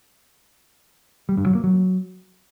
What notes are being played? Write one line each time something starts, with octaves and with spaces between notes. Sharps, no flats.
G3
G2
F#3
A#3
F#3